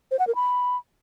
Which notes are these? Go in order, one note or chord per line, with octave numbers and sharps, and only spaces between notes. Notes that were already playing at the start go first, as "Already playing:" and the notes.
C5
F#5
A#4
B5